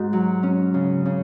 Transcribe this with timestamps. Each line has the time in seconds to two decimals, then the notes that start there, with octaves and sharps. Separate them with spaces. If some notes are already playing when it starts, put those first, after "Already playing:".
Already playing: G#2 F#4
0.13 F#3
0.43 C#4
0.74 C#3
1.06 C#3